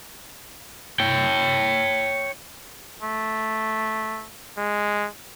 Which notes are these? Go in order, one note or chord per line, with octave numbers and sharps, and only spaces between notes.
C#5 G5
A3
G#3